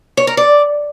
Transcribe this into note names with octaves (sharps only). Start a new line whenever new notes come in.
C#5
A#4
D5